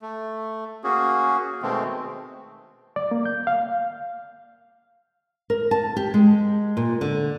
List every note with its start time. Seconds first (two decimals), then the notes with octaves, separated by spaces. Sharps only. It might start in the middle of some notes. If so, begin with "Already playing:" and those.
0.02 A3
0.84 A#3 C#4 F#4 G#4
1.62 B2 D#3 G#3 A3 C4
2.96 D5
3.11 A#3
3.25 G6
3.47 F5
5.50 A#4
5.71 A5
5.96 G4
6.14 G#3
6.77 A#2
7.01 D3